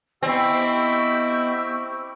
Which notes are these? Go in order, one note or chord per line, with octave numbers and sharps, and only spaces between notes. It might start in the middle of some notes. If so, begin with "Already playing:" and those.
B3 C4 E4 G4 D#5 C#6 E6